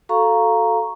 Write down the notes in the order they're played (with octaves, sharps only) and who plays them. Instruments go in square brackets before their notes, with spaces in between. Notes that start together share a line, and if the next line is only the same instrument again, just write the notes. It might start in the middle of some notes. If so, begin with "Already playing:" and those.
[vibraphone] F#4 A4 F5 A#5 C#6